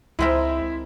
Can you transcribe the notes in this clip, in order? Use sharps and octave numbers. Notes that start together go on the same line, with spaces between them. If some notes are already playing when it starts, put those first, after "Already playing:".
C#2 G#3 C4 E4 A#4 E5